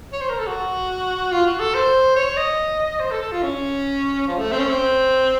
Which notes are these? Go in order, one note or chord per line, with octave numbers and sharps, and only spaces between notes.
C#5
C5
A#4
A4
F#4
F4
F#4
A4
C5
C#5
D#5
C5
A4
A4
F4
C#4
F3
A3
C4
C#4
C4